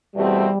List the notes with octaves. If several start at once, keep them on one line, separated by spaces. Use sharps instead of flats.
E2 B2 G3 A3 C4